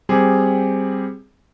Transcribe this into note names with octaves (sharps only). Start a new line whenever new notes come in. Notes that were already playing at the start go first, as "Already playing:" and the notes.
G3 C4 G4 G#4